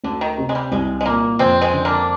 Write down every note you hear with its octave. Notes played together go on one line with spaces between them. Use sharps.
D2 D3
D#3
C3
G#3
G3
C2 G#3
G#3
A#2 A#3
F2 G#3 C4
G#3 C4
D3
A#3 D4